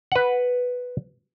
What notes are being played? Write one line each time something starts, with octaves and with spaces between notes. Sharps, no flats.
B4 F#5